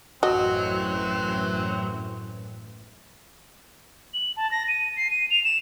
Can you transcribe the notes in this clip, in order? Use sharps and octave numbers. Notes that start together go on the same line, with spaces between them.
A1 F#2 E3 F#3 C4 F#4 D#5
F#7
A5
A#6
D#7
C7
D#7
F7
E7